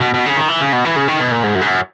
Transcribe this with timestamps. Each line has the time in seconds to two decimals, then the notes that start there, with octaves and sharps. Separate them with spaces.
0.01 B2
0.14 B2
0.26 C#3
0.36 D#3
0.48 E3
0.60 C#3
0.73 B2
0.85 E3
0.96 C#3
1.08 D#3
1.19 B2
1.31 A#2
1.43 G#2
1.55 F#2
1.61 G#2
1.67 F#2